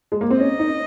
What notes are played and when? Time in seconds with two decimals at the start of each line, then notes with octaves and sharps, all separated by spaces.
0.12 G#3
0.21 A#3
0.30 C4
0.40 C#4 D#5
0.59 D#4